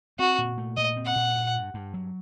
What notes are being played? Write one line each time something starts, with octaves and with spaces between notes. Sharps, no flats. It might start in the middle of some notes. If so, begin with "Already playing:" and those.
C4 F#4
A#2
A3
A#2 D#5
C4
F#5
A#2
G2
G2
G2
F#3